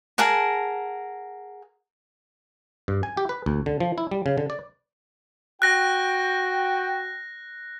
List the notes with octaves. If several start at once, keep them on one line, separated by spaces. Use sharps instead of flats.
G#4 A#4 F#5 A5
G2
G#5
G4
B4
D2
D3
F3
E4
G3
C#3
D3
D5
F#4 G5 F#6 A#6